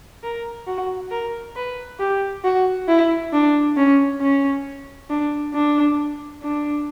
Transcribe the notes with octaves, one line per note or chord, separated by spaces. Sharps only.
A#4
F#4
A#4
B4
G4
F#4
E4
D4
C#4
C#4
D4
D4
D4